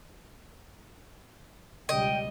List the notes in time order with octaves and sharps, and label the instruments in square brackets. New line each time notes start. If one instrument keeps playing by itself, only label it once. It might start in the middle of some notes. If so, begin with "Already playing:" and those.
[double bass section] C#2 B2 G3 [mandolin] D#5 [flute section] G5